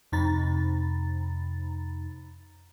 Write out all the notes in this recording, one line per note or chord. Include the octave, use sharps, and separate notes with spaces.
F2 C3 D#4 A#5 B5 A6